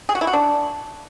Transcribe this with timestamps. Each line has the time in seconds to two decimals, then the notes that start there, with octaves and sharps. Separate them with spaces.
0.09 G#4
0.15 F#4
0.21 E4
0.27 F#4
0.33 D4